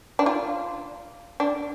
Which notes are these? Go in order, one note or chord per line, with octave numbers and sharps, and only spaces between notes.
D4
F4
D4